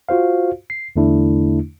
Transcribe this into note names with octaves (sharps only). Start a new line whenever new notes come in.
F4 F#4 C5 F5
C7
E2 D3 A3 D4 E4